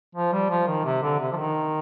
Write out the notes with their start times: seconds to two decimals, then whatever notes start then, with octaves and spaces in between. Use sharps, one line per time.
0.15 F3
0.33 G3
0.50 F3
0.67 D#3
0.85 C3
1.02 D3
1.20 C3
1.32 F3
1.36 D#3